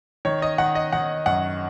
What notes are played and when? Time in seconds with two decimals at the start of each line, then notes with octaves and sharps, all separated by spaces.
0.25 D#3 C#5
0.42 D#5
0.58 D#3 F#5
0.75 D#5
0.92 D#3 F#5
1.26 F#2 F#5